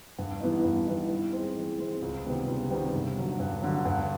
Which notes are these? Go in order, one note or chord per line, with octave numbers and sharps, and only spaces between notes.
G2
E3 G3 B3 D#4
G2
E3 G3 B3 D#4
E3
G#3 C4
E3
G#3 C4
C#2
C3 D#3 G3 B3
C#2
C3 D#3 G3 B3
G2
D3 F#3
G2
D3 F#3
G2